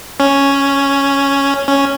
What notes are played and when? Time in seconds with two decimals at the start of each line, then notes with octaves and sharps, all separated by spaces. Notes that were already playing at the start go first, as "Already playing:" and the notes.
0.20 C#4
1.68 C#4